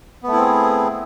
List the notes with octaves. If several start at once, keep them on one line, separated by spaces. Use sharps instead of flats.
A3 B3 C4 E4 G#4